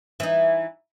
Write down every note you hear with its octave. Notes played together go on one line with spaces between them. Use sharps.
E3 D#4